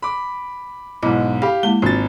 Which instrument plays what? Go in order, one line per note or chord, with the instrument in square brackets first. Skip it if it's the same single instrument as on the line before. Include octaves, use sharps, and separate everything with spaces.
[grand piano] B5 D6
[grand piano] B1 G#2 [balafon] E4 D#5 B5
[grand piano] G4 F5 [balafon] B5
[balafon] G#3 A#3 E4 [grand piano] G7
[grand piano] G#1 A6 [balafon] D4 F4 F#4